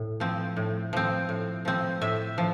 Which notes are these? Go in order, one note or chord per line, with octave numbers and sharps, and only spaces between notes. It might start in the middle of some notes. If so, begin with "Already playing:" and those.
Already playing: A2
F3 C4
A2
F3 C4
A2
F3 C4
A2 E5
F3